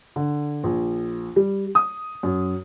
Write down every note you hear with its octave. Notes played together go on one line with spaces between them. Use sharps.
D3
A#1
G3
D#6
F#2